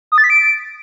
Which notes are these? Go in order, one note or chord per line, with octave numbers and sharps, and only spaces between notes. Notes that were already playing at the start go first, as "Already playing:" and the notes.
D#6
A6
B6
D7